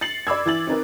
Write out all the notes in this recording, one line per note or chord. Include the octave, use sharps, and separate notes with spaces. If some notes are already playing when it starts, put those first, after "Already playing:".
A6 C7 C#7 F#7
D5 B5 D6 E6 G#6
E3 E4 A6 F#7
C4 D#4 A#4 B4